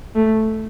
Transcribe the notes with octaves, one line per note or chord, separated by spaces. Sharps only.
A3